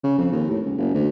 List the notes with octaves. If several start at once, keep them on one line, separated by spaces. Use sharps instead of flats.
C#3
F2
D#2
A2
C#2
F#1
D2